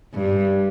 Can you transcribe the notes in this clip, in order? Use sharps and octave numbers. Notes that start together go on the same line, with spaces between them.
G2